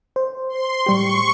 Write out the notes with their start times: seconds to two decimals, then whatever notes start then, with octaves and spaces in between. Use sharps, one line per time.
0.16 C5
0.49 C6
0.86 A2 G3 G4 C#6